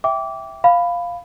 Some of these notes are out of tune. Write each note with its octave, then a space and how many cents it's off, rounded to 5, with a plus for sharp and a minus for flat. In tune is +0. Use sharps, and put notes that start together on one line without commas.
E5 +0 G5 +0 D6 -20
F5 +0 B5 +10